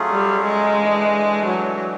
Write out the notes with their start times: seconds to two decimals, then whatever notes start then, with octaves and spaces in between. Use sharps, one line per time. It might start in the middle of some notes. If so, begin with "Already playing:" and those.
Already playing: F#3 A3 C#4 F4 G#4
0.11 G3
0.45 G#3
0.79 E3 A3 D4
1.45 F#3